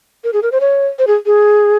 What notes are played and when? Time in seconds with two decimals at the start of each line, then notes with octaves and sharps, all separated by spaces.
0.24 A#4
0.33 G#4
0.43 A#4
0.52 C5
0.60 C#5
0.99 C5
1.07 G#4
1.26 G#4